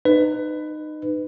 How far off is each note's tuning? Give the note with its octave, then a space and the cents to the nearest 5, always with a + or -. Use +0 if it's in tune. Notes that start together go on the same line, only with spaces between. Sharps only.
D#4 -25 B4 +15